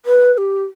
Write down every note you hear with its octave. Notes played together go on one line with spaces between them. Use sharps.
B4
B4
G4